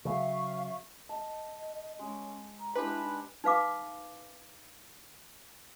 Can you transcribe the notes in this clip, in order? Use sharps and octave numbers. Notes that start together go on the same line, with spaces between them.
C#3 F#3 E5 F5 C#6
D#5 A5
G#3 C#4
A#5
G#3 D4 E4 G4 B4
D#4
D#4 B4 F5 D6